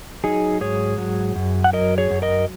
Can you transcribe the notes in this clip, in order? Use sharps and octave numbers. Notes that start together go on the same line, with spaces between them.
F#3 D#4 G#4
G#2 G#4 C#5
F#3
F#2
F#5
F#3 A#4 D#5
G#4 C#5
F#2
A#4 D#5